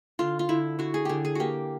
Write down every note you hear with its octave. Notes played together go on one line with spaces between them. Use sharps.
D3 F4
F4
D3 E4
D3 F#4
G#4
D3 G4 G#4
G#4
A#3 F#4 G4